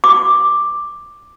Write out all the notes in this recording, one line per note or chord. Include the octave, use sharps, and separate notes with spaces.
D6